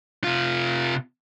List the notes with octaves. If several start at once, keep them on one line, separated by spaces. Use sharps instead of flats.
C3 F4